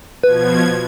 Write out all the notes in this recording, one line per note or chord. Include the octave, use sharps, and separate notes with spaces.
B2 F3 B4 G#6